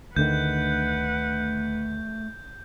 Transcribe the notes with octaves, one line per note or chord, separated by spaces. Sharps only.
D2 D3 D#3 A3 B4 F#5 G6